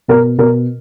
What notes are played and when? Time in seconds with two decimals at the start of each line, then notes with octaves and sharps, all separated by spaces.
0.08 B2 A#4
0.38 B2 A#4